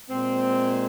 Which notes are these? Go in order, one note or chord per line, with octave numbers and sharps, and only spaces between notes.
A#2 G#3 C4